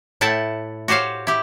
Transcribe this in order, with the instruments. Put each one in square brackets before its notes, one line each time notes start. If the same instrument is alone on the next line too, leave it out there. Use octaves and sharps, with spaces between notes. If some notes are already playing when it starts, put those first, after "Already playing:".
[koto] A2 E4 F#5 G5 A5
F#4 G4 C5 C#5 F5
E4 G4